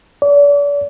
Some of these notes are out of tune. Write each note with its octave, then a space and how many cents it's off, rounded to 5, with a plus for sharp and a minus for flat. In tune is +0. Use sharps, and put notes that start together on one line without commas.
D5 -40